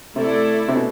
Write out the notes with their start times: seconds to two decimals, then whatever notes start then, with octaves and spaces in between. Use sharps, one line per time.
0.16 C3 A3 E4 A4 D5
0.68 C3
0.76 B2